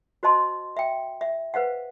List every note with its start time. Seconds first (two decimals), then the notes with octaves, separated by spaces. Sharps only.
0.23 F#4 C5 D#5 A5 C6
0.77 E5 G5
1.21 E5
1.54 B4 C5 F5 F#5